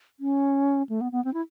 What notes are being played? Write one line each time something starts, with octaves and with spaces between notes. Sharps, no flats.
C#4
A3
B3
B3
C4
E4